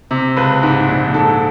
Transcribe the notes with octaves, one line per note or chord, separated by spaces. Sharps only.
C3
C#2 B4
G#2
A#1
G#2 A4